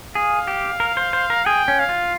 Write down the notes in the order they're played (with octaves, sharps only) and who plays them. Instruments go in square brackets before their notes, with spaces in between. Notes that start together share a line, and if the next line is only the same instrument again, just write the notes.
[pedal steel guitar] G#4 [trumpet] F5
[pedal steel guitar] G4
A#4
C5
C5
A#4
[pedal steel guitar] G#4 [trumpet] G5
[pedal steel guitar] C#4
[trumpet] F5
[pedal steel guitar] F4